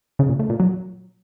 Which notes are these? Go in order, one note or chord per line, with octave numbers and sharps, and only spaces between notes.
C#3
A#2
A3
A#2
F#3